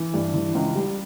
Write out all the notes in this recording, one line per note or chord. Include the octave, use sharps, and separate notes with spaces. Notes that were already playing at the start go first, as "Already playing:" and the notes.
Already playing: E3
G2
E3
C#2
G3